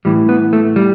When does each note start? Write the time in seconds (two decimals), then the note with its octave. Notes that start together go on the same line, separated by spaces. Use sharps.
0.05 A2 E3 G3
0.29 B3
0.53 A3
0.76 G3